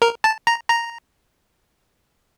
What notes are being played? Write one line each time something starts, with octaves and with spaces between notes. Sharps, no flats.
A#4
A5
A#5
A#5